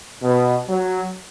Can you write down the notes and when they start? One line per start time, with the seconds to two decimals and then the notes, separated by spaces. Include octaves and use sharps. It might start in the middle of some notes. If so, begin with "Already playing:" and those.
0.21 B2
0.68 F#3